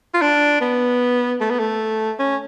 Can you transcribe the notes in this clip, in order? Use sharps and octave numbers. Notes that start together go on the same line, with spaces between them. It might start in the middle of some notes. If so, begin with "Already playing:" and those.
F4
D4
B3
A3
B3
A3
C#4